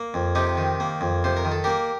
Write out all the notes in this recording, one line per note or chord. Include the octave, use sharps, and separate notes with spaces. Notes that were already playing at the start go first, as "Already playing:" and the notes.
Already playing: A#3
F2
C3 D#4 G4
D#3
A#3
F2
C3 C5
A#4
D#3
A4
A#3 G4 A#4